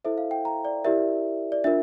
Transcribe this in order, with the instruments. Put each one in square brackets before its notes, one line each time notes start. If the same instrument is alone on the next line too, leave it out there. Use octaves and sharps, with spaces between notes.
[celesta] E4 A4 C5 E5
F5
G5
A#5
D5
E4 G4 A#4 D5 E5
D5
D4 F4 A#4 E5